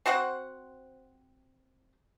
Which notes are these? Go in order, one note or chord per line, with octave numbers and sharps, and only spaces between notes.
C4 F#4 C5 F#5